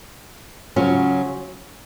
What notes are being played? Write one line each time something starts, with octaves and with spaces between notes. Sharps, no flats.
C#3 F#3 C#4 F4